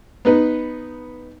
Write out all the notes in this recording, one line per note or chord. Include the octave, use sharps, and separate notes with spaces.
B3 D#4 B4